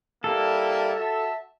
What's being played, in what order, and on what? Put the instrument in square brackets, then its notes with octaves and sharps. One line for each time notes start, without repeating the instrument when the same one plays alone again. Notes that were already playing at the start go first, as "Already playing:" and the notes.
[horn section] G3 A#3 E4 [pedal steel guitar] A4
[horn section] F#4 E5 A5